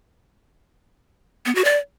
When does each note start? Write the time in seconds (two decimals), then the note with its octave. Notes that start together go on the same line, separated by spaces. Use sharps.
1.46 B3
1.55 F#4
1.65 D5